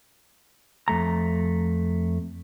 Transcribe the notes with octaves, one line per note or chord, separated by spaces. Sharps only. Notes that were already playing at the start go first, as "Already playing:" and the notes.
F2 A3 A#5